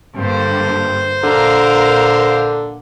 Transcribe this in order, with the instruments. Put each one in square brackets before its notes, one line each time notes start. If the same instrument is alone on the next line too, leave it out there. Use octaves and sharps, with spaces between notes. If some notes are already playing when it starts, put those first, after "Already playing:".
[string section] G2 D3 A#3 [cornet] C5
[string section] A#1 A#4 F5 [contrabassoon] D3